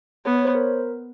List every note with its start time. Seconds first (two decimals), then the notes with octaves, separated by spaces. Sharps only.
0.25 B3 C#5
0.35 C#5
0.45 C5
0.55 A#4